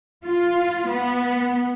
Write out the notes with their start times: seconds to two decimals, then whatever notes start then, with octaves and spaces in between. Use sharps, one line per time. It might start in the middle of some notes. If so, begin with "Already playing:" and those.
0.25 F4
0.90 B3